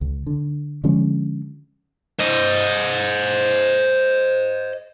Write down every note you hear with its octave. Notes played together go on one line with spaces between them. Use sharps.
C#2
D3
D3 F3 G#3 C#4
C5 D#5